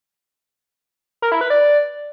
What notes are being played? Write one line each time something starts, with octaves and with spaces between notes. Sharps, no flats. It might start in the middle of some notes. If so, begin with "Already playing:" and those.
A#4
E4
B4
D5